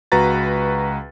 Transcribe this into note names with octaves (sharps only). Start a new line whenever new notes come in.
C#2 F#4 B4 A#5 A6